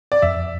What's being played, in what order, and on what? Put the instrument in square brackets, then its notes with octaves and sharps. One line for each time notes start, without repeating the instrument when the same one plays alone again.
[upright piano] D5
[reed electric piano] F2 [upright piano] E5